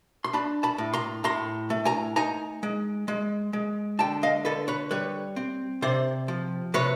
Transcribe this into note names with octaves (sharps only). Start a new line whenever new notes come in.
C6
D4 A5 B5
A5 B5
A2
A#5 C6
A2 A#5 C6
A3
G#5 A#5
D#4 G#5 A#5
G#3
G#3
G#3
D3 G5 A5
D#5 F5
D3 A4 B4
B4 C#5
G3 B4 C#5
C4
C3 C5 D5
F3
C3 B4 C#5